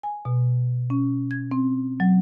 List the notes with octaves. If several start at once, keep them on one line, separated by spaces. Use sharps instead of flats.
G#5
B2
C#4
G#6
C4
F#3